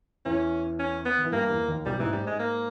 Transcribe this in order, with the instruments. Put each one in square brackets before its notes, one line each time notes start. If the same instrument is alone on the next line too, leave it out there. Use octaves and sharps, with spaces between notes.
[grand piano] E2 E3 [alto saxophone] C#4
[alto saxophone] C#4
B3
[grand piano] D#3
E3
[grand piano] G2 G3 [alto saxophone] A#3
[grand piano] E2 E3
D#2 D#3
[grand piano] B1 B2 [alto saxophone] G3
[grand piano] G#2 [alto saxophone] E3
[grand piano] G#2 [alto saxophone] G3
[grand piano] G#2 [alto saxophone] G#3
[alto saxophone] A#3